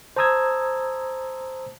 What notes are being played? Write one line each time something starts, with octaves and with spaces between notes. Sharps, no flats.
C5 A5 A#5 D#6 E6 G#6